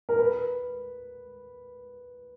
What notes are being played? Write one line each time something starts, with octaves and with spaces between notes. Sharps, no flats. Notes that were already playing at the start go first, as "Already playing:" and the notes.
A#4
B4